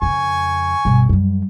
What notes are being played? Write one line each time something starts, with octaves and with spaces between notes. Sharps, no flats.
F2 C#3 G#5 C#6
G1 B2
F#2 G3